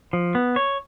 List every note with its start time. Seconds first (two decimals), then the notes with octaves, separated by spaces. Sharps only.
0.13 F3
0.35 B3
0.56 C#5